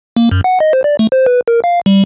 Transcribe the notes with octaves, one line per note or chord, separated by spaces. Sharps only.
A#3
F#2
F#5
D#5
C5
D5
A3
C5
B4
A#4
F5
G3